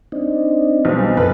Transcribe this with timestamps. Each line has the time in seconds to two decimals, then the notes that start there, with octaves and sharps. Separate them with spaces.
0.12 C4 D4 D#4
0.85 B1 G3 C4
1.17 F#2 C#3 F#3 A4 B4